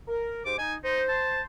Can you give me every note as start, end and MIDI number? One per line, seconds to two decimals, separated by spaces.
0.08 0.41 70
0.45 0.58 44
0.45 0.58 67
0.45 0.58 72
0.45 0.57 86
0.58 0.77 63
0.58 0.74 80
0.84 1.02 63
0.84 1.45 72
1.08 1.42 81